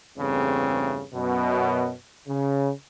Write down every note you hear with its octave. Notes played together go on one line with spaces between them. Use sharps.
E2 G2 C#3 A3 C4
F#2 B2
C#3